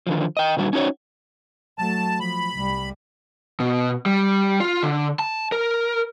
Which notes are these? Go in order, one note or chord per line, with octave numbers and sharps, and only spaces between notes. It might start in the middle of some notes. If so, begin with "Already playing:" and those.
D3 D#3 F3
D#5 G5
A#2 D3 D#3 G3 F#4
C#4 D#4 F#4 C#5
F#3 A3 A5
F3 B5
C2 G3
B2
G3
F4
D3
A5
A#4